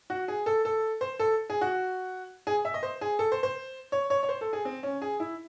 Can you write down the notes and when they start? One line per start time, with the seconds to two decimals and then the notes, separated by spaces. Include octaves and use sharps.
0.10 F#4
0.28 G#4
0.46 A4
0.65 A4
1.01 C5
1.19 A4
1.50 G#4
1.61 F#4
2.47 G#4
2.65 E5
2.74 D#5
2.83 C5
3.01 G#4
3.19 A4
3.32 C5
3.43 C5
3.92 C#5
4.10 C#5
4.23 C#5
4.29 C5
4.41 A4
4.53 G#4
4.65 C4
4.83 C#4
5.02 G#4
5.20 E4